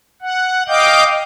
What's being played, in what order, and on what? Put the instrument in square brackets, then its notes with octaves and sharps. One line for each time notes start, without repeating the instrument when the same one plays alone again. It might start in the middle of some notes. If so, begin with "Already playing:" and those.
[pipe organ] F#5
D#5 F5 G5 D6 G6